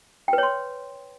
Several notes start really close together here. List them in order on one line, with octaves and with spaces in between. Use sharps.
G5 B4 C#5 C6